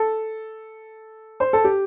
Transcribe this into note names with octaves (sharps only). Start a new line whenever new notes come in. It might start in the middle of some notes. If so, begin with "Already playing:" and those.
Already playing: A4
C5
A4
G4